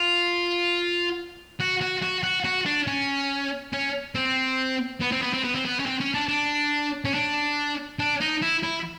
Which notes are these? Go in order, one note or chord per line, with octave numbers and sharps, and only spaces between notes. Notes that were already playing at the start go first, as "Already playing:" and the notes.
Already playing: F4
F#4
F#4
F#4
F#4
F#4
D4
C#4
C#4
C4
B3
C4
B3
C4
B3
C4
B3
C#4
C4
C#4
D4
D4
C#4
D4
D4
D#4
E4
E4